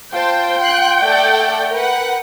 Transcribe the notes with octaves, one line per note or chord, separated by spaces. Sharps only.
F4 C5 G5 A5
C6 F#6
A3 A4 D5 F#5
A#4 B4 F#5